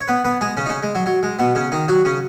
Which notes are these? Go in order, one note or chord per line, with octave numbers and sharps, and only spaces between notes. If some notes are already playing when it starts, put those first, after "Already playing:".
C#5
B3 B4
B3 B4
G#3 G#4
C#3 C#4
D#4
C#3 C#4
G#3
F#3
F#3
G#3
B2 B3
C#3 C#4
D#3 D#4
F#3 F#4
C#3 C#4